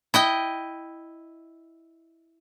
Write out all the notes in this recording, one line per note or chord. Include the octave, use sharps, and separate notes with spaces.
E4 D#5 G5